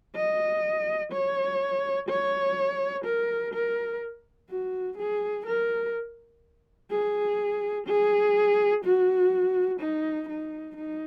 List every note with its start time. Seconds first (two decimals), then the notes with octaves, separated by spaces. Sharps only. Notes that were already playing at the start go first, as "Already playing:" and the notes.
0.16 D#5
1.12 C#5
2.09 C#5
3.05 A#4
3.54 A#4
4.50 F#4
4.98 G#4
5.46 A#4
6.91 G#4
7.87 G#4
8.84 F#4
9.80 D#4
10.29 D#4
10.77 D#4